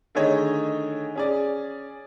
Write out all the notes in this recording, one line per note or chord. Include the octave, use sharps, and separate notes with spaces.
D3 D#3 A3 G#4 C#5 D#5
C#4 G#4 D5